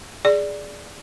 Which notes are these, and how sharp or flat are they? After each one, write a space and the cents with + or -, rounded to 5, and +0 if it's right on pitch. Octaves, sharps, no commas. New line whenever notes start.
G#4 +0 D5 +0